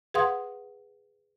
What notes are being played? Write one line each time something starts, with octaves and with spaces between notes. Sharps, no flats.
G#4 B4 F5 F#5 C6 D#6